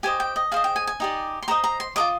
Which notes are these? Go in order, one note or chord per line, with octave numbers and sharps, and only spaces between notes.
G4 C5 D#5 G#5
G5
D#5
G#4 C5 D#5 F5
G5
G#5
G#5
D#4 G4 D5
C6
G4 C5 D#5 A#5
A#5
C6
F4 A#4 D#5 D6